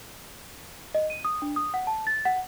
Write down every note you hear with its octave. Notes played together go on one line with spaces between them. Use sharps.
D#5
D#7
D#6
D4
D#6
F#5
A5
A6
F#5